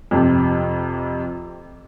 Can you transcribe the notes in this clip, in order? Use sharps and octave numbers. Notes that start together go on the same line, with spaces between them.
F2 C3